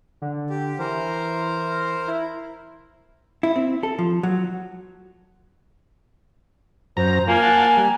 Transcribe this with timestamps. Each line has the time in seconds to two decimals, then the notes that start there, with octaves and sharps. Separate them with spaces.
0.22 D3
0.50 G4
0.79 E3 A#4 C5
2.08 E4
3.43 E4
3.56 C4
3.83 A4
3.99 F3
4.23 F#3
6.97 F#2 C5 A#5
7.28 A#3 F4 G#5
7.42 F#5 A5
7.77 G3